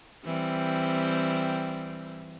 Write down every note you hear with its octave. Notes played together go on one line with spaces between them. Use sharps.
E3 G3 C4